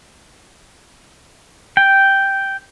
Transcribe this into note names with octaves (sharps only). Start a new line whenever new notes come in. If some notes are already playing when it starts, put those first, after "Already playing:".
G5